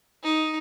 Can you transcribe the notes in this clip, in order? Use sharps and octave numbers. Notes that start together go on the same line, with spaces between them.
D#4